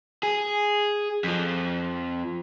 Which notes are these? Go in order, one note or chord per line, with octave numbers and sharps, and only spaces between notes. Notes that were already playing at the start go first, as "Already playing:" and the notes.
G#4
F2 F3